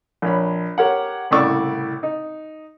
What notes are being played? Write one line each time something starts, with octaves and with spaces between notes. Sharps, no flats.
A#1 C#5 B5
G4 A#4 C#5 F#5
C2 A2 C#3 D5 C#6 E6
D#4